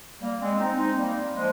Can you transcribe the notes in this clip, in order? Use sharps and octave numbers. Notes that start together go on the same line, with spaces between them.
G3 A#3
G#3 C4
C4 D#4
C4 D#4
G3 A#3
F3 G#3